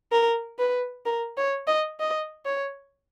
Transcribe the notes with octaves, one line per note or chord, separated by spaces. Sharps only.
A#4
B4
A#4
C#5
D#5
D#5
C#5